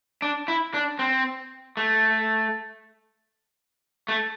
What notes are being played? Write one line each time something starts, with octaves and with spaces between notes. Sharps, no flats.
D4
E4
D4
C4
A3
A3